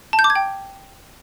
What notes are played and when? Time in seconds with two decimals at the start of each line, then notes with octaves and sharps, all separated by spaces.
0.13 A5
0.19 G6
0.24 D6
0.30 G#6
0.35 G5